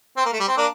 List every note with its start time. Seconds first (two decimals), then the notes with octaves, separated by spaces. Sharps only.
0.17 C4
0.25 A#3
0.33 A3
0.40 G3
0.48 C4
0.57 A#3 D4